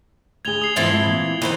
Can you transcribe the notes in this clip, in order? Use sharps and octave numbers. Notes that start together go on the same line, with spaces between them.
D2 G#4 G#6 F7 G7
D#6 C7
G#2 E3 F3 C4 E4 A5
D2 G#2 E5
A#2 E3
D#3 E3 E4 C5